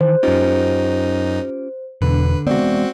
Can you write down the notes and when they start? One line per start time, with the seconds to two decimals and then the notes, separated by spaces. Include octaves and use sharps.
0.01 D#3 E3 C5
0.23 F#2 C#4 D#4 F4 G4
2.02 E2 B2 D3 B4
2.47 G#3 B3 C4 F#4 D5